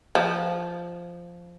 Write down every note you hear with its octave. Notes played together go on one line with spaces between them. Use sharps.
F3